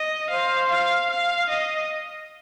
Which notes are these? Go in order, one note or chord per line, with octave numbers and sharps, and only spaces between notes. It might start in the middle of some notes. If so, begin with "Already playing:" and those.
Already playing: D#5
C5 F5
F5
F5
D#5